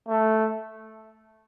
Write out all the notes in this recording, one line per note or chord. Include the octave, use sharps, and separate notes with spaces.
A3